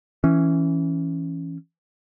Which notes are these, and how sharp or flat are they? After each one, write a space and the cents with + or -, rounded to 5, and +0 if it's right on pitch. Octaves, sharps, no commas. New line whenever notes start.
E3 +0 C#4 +0